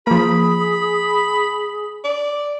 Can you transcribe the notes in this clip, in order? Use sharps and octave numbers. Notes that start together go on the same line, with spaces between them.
F3 A#3 G#4 B5
D5